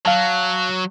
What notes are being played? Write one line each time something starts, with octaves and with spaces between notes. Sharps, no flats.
F#3 F5 A5